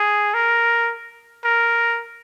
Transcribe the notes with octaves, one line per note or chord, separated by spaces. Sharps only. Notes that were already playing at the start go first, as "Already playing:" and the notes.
Already playing: G#4
A#4
A#4